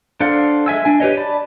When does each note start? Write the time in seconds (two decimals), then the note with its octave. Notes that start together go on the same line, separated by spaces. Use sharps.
0.20 D4 A4 C5 F5 F#5
0.66 G#3 E5 G#5 E6
0.85 D4 G#5
1.00 G4 B4 C#5 D#5
1.17 D5 A5 B5